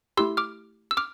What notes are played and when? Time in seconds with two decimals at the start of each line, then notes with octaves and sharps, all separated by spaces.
0.17 A3 E4 G4 C6 E6
0.37 D6 F6
0.91 E6
0.97 D6 F6